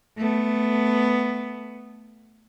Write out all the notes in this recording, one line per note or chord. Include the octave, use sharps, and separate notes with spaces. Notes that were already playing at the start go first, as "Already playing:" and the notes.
A3 B3